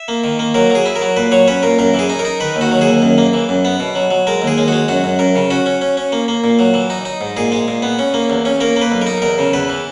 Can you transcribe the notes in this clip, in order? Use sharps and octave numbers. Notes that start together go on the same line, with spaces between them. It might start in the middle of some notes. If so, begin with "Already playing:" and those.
Already playing: E5
A#3
D#3
A#3
F#3 A#4
F#3
G#4
E4
A#4
F#3
A#2 B4
F#3 C#5
C#4 B4
A#2 A#4
F#2 A#4
E3
G#4
D#4
A#4
D#4
D#3 B4
D#2
F#4
F#3
G#4
D#2
F#2
A#3
E3
F#2
B3
B2
F#3
F#3
G#3 A#4
D#2
G#4
G#3
G#3 F#4
F#2 F#4
F#2
F#2 A#4
C#3
C#4 F#4
C#4
C#4
C#4
A#3
A#3
A#2
F#3
E3
D#4
D#4
G#2
A#2 G#4
G#3
A#2
B3
C#4
A#3
E2
C#4
A#3 A#4
A#3
B4
B1
A#4
D#4
E2 A#4
C#3
E2 B4
E3